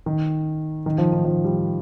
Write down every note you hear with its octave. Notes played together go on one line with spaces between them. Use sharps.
D#3
D#3
F3
D#3
F3
G3